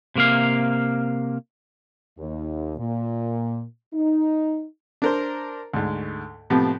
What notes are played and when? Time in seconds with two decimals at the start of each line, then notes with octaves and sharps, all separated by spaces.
0.16 C3 A#3 F5
2.18 D#2
2.78 A#2
3.94 D#4
5.02 D4 A#4 C5
5.74 D2 G#2
6.50 A2 C3 F3 B3 C4